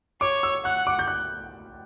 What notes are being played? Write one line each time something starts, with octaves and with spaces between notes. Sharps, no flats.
C#5 D6
E6
F#5 F#6
D6
G6
F#6